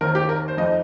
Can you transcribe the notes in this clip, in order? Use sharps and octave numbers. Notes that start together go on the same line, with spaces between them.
D#2 D#3 C4 A#4
G4
A#4
C5
F2 F3 D#4 D#5